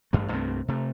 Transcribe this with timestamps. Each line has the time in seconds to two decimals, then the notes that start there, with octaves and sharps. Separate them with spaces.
0.13 A1 G2 A3
0.32 C2 G2 A3 C4
0.68 C3 A3